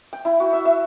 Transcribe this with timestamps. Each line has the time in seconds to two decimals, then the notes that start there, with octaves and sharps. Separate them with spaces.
0.13 G5
0.25 E4
0.40 F#4
0.53 E5
0.65 E5